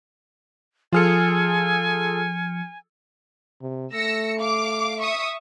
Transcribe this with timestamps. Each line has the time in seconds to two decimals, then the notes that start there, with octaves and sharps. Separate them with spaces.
0.93 F3 F4 G#4 A4 G#5 F6 C#7
3.61 C3
3.93 A3 E6 A#6 C#7
4.40 F5 D6
5.00 E5 C#6 D#6